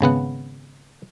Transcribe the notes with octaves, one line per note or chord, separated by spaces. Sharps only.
G#1 C#3 B3 F#5